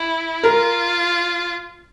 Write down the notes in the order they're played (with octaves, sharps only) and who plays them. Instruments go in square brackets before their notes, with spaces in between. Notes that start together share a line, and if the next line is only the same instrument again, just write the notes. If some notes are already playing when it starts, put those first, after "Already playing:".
Already playing: [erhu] E4
[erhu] F4 [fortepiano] A#4